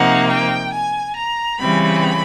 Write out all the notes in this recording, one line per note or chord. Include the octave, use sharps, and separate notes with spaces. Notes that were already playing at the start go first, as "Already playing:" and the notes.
Already playing: C3 F3 A#3 D#4 F#5
G5
G#5
A#5
C#3 E3 G3 C4 B5